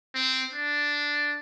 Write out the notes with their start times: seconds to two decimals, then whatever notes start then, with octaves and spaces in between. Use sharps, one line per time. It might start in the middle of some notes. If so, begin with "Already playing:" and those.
0.15 C4
0.54 D4